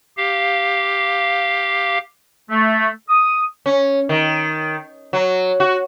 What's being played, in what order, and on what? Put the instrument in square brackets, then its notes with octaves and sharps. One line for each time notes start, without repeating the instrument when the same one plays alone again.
[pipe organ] G4 F5
[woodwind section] A3
D#6
[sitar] C#4
D#3
F#3
F#4